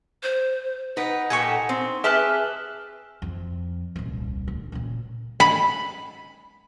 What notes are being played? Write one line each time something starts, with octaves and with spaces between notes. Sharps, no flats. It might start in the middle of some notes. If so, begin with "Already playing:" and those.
C5
D#4 B4 F#5
A#2 G4 A4 G#5 C#6
C4
G4 G#4 B4 E5 A5 F6 F#6
F2
D#1 C2
D2
A#2 C#3
B5